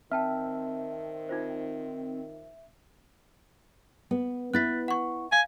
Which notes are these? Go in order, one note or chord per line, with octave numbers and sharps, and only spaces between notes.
D#3 C4 E5 G5 A5 F6
D#4 F4 C5
B3
B3 E4 F#6 A6 B6
F#5 C#6
F5 G#5